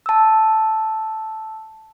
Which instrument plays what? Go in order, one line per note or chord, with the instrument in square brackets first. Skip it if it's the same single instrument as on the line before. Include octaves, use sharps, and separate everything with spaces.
[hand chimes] A5 E6